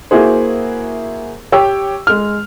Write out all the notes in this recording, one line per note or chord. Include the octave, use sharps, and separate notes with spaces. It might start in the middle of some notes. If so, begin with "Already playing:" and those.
A#3 E4 F#4 G#4 C5
G4 C#5 G5 D6 E6
G#3 F6